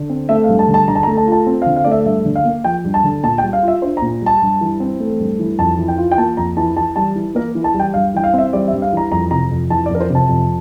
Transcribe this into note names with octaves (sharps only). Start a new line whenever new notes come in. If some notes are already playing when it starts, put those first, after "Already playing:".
Already playing: D3
C4
A3 E5
F5
G2
A5
D3
A5
D3 A#5
A5
A#5
A3
A5
F4
A5
C4
F5
D3
F5
A3 D5
E5
G2 E5
D3
F5
A#3
F3 G5
G2
A5
D3
A#2 A5
G5
G3
F5
F4
E5
D4 C5
A#5
A#2
G3 A5
G2
E3
C4
A3
G2
E3
F2 A5
E3
G5
F4
G5
A#3 A5
F2 A#5
E3 A5
E3 A5
G3 A5
E3
A#3 A#4
E3
A5
G3
G5
G2 F5
E3 G5
F5
C4
E5
G3 D5
E5
G2
F5
E3 A#5
F2 A#5
C3 A#5
F2
E3 A5
D5
F2
A#4
C5
C3 A5
F2